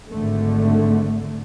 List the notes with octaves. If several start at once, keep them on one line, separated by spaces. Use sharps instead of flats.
G#1 D3 A3